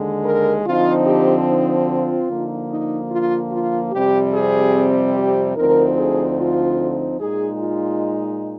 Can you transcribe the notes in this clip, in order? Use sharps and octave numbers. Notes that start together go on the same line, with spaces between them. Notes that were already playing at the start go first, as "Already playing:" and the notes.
Already playing: D#2 D3 G#3
A#4
D3 F3 C4 D#4 F4
G4
D#4
F4
D3 F3 A#3 D#4
D#4
F4
F4
F2 C3 G3 C4 G4
G#4
G4
D2 D3 F3 C4 D#4 A#4
G#4
F4
A#2 G#3 D#4 G#4
F4